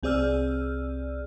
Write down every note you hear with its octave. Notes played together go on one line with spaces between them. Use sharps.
C2 C4 G#4 D5 E6 F6